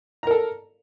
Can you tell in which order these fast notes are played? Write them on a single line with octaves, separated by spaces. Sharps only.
A#5 A#4 A4